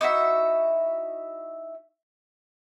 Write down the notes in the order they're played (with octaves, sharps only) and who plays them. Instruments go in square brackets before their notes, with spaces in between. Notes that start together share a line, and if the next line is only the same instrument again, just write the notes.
[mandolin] D#4 E4 F#4 E5